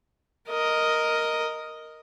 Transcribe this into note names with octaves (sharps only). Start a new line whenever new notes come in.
A#4 D#5